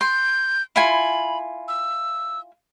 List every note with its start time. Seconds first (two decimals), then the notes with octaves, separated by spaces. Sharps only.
0.01 C6 G6
0.76 E4 F4 G#5 B5
1.68 E6